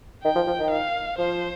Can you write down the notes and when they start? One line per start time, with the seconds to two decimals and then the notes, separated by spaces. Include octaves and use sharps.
0.24 D#3 G5
0.36 F3
0.47 F3
0.60 D#3
0.71 F5
1.19 F3 C5